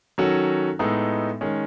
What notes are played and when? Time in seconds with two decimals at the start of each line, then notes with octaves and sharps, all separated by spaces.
0.18 D#3 F#3 C#4 F#4 A4
0.79 A2 G#3 B3 D#4 A4
1.41 D#3 G#3 C#4